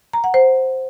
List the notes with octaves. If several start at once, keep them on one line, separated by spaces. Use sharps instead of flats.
A#5
F#5
C5